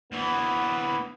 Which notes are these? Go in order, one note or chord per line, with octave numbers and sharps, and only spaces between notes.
D2 E3 B3